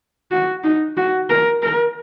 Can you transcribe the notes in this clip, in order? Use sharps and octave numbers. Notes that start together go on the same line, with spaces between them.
F#4
D#4
F#4
A#4
A#4